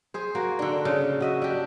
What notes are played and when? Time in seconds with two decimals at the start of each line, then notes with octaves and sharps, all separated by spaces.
0.14 G#4 C5
0.35 A#3 F#4
0.59 D3 D4
0.85 C#3
1.20 F#4 D#5 E5
1.42 D4 G4